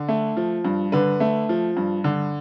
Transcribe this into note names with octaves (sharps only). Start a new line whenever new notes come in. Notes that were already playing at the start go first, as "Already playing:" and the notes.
Already playing: D3
A3
F3
G2
D3 B4
A3
F3
G2
D3